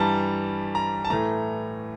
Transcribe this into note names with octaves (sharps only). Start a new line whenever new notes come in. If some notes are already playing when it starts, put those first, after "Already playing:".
Already playing: G2 E3 G3 A5 A#5
A#5
A5
A2 E3 A3 A#5